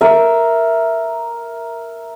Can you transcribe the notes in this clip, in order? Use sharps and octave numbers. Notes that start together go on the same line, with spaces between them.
A#4 E5